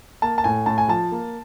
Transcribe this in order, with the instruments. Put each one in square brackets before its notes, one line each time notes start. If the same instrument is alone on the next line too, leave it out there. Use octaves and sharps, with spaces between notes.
[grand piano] A#3 A5
A5
A2 G#5
A2 A5
G#5
F3 A5
A#3